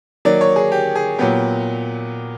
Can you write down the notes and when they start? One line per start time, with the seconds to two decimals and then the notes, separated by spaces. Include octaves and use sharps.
0.25 D#3 F#3 A#3 D5
0.41 C#5
0.56 G#4
0.72 G4
0.95 G#4
1.19 A#2 F#3 B3 G4